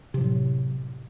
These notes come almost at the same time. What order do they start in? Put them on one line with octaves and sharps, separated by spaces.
C3 F3 A2 F#3